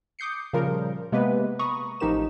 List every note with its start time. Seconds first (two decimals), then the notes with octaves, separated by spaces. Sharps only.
0.19 D6 D#6 G6 C7 C#7
0.53 A#2 C#3 F3 G3 F4 A#4
1.12 C3 G#3 A#3 B3 B4
1.59 A#5 B5 C#6 D#6
2.00 A1 F3 D#4 G4 A#4 E7